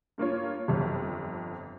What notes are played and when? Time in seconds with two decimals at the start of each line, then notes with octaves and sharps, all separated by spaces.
0.18 G2 A#3 F4 C#5
0.68 G1 F2